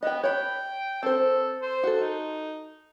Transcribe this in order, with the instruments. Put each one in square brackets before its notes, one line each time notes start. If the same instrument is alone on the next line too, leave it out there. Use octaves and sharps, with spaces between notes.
[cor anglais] B3 [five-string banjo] D#5 G5
[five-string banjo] C#5 B5 [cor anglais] G5
[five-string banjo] C4 C5 [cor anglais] A4
[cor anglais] C5
[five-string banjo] F#4 A4
[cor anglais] D#4